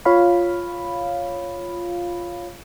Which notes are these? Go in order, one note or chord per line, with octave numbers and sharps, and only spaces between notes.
F4 C#5 F5 B5